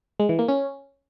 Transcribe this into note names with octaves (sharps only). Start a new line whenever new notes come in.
G#3
E3
A#3
C#4